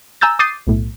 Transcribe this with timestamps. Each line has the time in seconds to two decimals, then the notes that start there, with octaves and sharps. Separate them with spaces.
0.21 G#5 A#5 E6 G6 A6
0.39 D6 D#6 G6 A6 C7 D#7
0.67 B1 A2